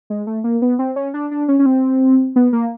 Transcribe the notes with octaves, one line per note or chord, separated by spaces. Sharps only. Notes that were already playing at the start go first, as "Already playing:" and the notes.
G#3
A3
A#3
B3
C4
C#4
D4
D4
C#4
C#4
C4
B3
A#3